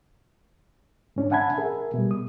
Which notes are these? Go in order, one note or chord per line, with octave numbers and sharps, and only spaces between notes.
G#2 C#4 D4
E5 F#5 G#5 A5 B5 G#6
G#4 A#4 E5
B2 G3
D#6